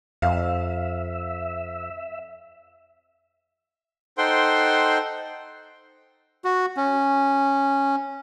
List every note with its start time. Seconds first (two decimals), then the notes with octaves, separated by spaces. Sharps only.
0.22 F2 E5 F5
4.18 D#4 A4 C5 F#5 G5 C6
6.45 F#4
6.77 C#4